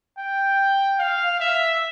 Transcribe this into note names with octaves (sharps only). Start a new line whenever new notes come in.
G5
F5
E5